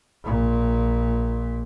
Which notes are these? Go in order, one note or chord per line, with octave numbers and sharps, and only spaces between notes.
A#1 A#2